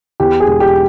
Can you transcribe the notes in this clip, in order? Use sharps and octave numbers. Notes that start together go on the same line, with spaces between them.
E2 G4
G#4
E1
G4